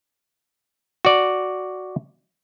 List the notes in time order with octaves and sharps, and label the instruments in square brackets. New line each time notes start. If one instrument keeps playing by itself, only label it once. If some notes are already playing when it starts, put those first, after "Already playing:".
[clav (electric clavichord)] F#4 D5